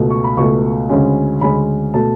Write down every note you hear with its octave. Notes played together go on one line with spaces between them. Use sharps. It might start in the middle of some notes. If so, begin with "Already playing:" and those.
Already playing: C#2 B2 A3
C#6
B5
C#2 B2 A3 C#6
D2 C#3 G#3 C#4
D2 C#3 G#3 C#4 B5
B2 A3 A5